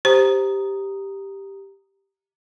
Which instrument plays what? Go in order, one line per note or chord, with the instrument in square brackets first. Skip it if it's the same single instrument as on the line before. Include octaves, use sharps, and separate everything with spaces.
[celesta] G4 A#5 D#6 [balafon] C5